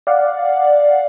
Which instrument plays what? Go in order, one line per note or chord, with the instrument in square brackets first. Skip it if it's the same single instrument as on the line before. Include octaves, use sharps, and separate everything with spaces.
[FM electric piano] D5 F5 F#5